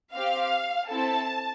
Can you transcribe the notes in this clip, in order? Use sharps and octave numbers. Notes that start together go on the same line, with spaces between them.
C4 G4 F5
C4 E4 A4 A5